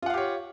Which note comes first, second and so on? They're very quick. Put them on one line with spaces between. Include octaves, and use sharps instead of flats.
F4 F#5 F5 G4 C#5